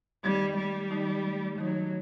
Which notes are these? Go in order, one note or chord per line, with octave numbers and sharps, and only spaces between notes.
D#3 G3 A3 D#4
G3
D#3 A3 D#4
D#3 F#3 A3 D#4